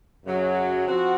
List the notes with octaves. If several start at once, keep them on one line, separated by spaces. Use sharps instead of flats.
F#2 C#3 F#3 C#4
F3 C4 F#4